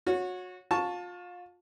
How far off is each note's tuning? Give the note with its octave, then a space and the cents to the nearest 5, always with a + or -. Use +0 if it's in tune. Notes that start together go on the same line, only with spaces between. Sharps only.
F#4 -25 C#5 +0
F4 +30 A5 +0 C#6 +0